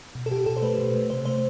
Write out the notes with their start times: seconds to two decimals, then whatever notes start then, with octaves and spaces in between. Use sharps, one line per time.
0.15 B2
0.26 A4
0.31 B2 G4
0.46 B2 A4
0.56 C5
0.62 A3 B4
0.78 B2
0.95 A3
1.10 C3 C5
1.25 A3 C5